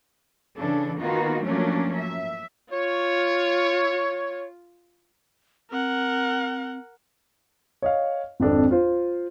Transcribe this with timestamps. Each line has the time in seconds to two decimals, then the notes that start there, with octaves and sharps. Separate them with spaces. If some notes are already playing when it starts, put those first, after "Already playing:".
0.58 C#3 E3 D4 A4
1.01 D#3 A#3 B3 D#4 F4 F#4
1.45 F3 F#3 A3 A#3 C#4 D4
1.98 E5
2.73 F4 C#5
5.72 C4 A#4 F#5
7.82 C#5 D#5 F5
8.40 G#1 F2 D4 A4
8.71 F4 C5